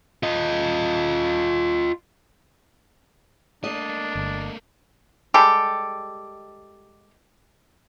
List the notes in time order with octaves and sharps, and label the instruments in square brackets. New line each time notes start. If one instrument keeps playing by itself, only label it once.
[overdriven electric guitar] F4 D#5
[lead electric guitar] A3 A#3 [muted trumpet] D4 [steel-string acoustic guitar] D#5
[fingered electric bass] G1
[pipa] G3 G#3 G4 A4